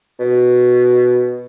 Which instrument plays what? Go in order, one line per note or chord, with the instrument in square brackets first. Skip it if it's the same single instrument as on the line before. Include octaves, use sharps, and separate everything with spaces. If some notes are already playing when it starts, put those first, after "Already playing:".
[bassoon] B2